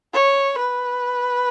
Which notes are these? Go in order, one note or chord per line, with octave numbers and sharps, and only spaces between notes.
C#5
B4